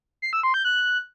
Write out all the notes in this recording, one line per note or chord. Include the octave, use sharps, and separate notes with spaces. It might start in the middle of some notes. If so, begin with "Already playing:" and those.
C7
E6
C6
G6
F#6